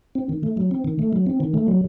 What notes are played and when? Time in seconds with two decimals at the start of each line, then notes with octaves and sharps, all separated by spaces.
0.15 C4
0.29 D#3
0.43 A3
0.57 F#3
0.71 C4
0.85 D#3
0.99 A3
1.13 F#3
1.27 C4
1.40 D#3
1.54 A3
1.68 F#3